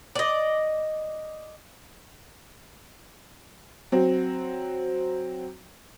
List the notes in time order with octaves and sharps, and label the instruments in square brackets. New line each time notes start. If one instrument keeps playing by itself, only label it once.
[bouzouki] D5 D#5
[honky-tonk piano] F#3 C4